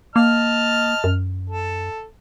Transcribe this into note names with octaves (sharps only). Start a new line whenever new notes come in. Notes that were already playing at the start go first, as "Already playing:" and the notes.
A#3 D#5 A5 F6
F#2
A4